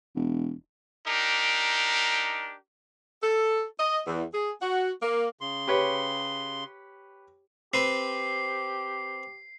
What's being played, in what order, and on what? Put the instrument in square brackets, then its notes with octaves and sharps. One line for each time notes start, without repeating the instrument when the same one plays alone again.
[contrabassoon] E1
[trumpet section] D4 D#4 G4 A#4
[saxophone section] A4
D#5
E2
G#4
F#4
A#3
[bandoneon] C#3 C6
[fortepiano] G4 B4 C#5
[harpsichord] C4 B4 [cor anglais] G4 [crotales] C7